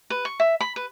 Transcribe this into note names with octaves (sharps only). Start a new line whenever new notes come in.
B4
C#6
E5
B5
B4